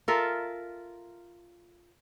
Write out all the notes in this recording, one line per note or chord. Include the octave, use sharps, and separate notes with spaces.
F4 A4 A#4 E5